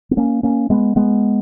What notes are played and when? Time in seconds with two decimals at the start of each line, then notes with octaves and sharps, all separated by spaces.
0.11 B3
0.17 A#3 C#4
0.43 A#3 C#4
0.70 G#3 B3
0.96 G#3 B3